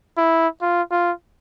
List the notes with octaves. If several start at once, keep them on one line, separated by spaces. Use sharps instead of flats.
E4
F4
F4